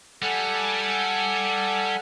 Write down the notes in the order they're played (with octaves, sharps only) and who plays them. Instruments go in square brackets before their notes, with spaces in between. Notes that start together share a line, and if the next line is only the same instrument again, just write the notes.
[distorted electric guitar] G3 [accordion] A4 F#5 G#5